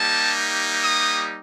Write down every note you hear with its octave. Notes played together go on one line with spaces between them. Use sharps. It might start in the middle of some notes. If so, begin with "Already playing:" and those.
Already playing: G3 A#3 D#4 G4 A5
D#6